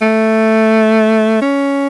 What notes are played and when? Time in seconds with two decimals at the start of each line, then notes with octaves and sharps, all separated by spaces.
0.02 A3
1.42 C#4